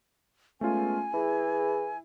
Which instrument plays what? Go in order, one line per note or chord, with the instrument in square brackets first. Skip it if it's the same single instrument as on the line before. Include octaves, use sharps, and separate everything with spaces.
[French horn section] G#3 B3 [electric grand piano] A3 C#4 F4 [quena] G#5
[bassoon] E3 [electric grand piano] E4 [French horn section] G#4